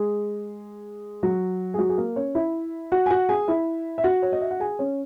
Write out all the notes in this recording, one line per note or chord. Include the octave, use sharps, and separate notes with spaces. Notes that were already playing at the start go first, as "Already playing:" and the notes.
Already playing: G#3 G#4
F#3 F#4
G#4
F#3 F#4
G#4
A#3 A#4
C#4 C#5
E4 E5
F#4 F#5
G#5
F#4 F#5
G#4 G#5
E4 E5
E5
F#4 F#5
C#5
D#5
E5
F#5
G#4 G#5
C#4 C#5